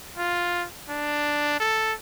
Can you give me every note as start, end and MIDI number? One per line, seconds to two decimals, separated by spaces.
0.17 0.65 65
0.89 1.59 62
1.60 1.93 69